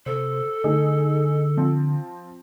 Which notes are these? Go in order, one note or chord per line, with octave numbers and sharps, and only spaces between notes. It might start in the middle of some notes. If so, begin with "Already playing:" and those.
C3 A4 C5
D3 A3 D#4 G#4
F3 C4